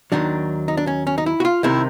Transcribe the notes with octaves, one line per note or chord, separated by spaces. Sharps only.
D#2 D#3 F#3 D4
D#4
D4
C#4
C#4
D#4
E4
F#4
F4
C2 C3 D#3 E4